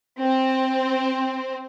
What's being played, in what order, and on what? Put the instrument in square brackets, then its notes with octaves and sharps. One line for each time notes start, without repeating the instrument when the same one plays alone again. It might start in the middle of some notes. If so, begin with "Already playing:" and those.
[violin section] C4